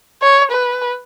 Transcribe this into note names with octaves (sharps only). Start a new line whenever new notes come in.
C#5
B4